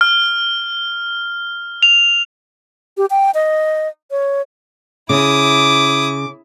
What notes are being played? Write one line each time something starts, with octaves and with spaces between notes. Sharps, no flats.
F6
F7
G4
G5
D#5
C#5
C#3 E4 D6 D#6